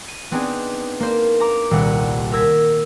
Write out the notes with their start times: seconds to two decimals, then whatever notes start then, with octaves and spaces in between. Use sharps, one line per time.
0.08 D#7
0.31 B3 C4 D4 D#4 G#4
1.00 A#3 C5
1.40 A#5 D6
1.71 D#1 C2 F#5
2.32 A#4 E6 G#6 A#6 B6